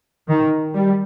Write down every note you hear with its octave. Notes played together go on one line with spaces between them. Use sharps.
D#3
G3